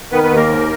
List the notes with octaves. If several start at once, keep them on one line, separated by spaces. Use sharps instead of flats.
D#3 B3 B4
B3 B4
D#2
A#3 A#4
G#2